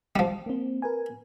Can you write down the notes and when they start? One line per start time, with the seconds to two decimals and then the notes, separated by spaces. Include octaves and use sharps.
0.16 F3 G3
0.46 A#3 C4
0.82 A#4 B4 G#5